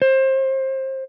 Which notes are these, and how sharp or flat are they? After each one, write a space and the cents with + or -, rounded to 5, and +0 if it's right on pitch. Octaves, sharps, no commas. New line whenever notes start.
C5 +25